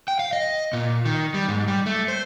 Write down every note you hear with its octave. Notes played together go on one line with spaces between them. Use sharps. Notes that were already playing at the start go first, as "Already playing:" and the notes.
G5
F5
D#5
A#2
D#3
G3
G#2
G3
A3
C5